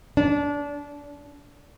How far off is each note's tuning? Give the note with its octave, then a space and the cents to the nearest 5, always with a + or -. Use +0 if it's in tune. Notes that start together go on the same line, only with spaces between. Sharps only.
D4 -25